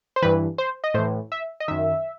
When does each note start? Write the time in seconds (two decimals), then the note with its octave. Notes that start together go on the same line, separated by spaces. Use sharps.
0.16 C5
0.22 G2 E3 B4
0.58 C5
0.84 D#5
0.94 A2 E3 C5
1.32 E5
1.60 D#5
1.68 F#2 D#3 E5